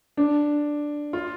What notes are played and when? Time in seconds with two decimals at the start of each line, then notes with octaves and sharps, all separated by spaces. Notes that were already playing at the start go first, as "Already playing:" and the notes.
0.17 D4
1.13 F4